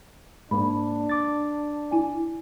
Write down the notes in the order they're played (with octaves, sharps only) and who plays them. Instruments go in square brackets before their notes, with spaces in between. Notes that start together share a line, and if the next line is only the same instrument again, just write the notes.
[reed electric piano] G#2 A#3 [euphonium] D4 [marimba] B5
[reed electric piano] D6 A6
[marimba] E4 G#5